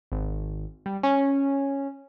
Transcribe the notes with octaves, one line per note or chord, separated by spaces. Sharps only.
G#1
G3
C#4